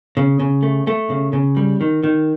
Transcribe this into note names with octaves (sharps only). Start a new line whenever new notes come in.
C#3
C#3
A3
A3
C#3
C#3
G3
D#3
D#3